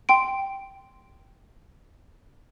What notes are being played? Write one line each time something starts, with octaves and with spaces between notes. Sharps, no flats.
G5 C6 D7